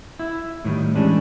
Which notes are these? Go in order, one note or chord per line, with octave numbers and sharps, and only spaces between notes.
E4
A2 D#3 F#3 G3
E3 G3 G#3 C#4 D4